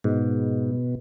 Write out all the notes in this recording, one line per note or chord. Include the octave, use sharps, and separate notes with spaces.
G#2 B2